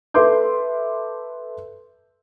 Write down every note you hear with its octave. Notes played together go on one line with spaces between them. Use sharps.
A4 B4 E5 C6 D6 G6